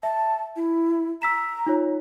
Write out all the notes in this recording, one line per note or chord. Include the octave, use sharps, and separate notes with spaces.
E5 A5
E4
A#5 E6 B6 E7
D#4 F4 C#5